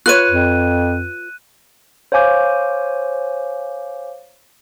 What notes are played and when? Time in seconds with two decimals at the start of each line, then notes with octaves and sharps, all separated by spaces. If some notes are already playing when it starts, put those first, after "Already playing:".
0.06 F4 B4 C#5 F#6 D#7
0.29 F2
2.12 C5 C#5 F5 G#5 D6 G6